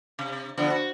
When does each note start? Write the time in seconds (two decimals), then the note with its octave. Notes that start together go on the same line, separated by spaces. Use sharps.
0.19 C3
0.57 D3 F3 B3
0.70 F#4